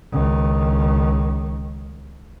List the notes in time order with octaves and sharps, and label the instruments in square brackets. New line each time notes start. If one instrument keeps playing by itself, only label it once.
[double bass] C#2 D#3